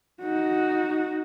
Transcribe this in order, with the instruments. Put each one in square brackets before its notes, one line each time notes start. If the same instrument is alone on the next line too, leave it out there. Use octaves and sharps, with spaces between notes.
[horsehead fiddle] D#4 F#4